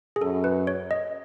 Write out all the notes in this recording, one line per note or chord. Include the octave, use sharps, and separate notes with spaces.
G#4
F#2 A4
B4
C#5
D#5